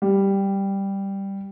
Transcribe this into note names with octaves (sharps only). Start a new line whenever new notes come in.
G3